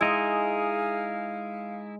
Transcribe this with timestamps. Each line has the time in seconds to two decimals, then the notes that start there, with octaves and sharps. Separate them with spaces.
0.01 G#3 D#4 E4 G#4 F5 G#5